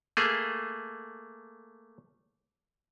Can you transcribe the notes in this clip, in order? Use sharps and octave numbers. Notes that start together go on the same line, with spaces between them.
A3 A#3 G#4